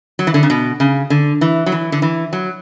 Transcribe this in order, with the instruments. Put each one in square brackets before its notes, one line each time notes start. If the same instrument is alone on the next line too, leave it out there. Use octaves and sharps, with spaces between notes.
[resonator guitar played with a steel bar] F#3
E3
D3
C#3
B2
C#3
D3
E3
F#3
E3
D3
E3
F#3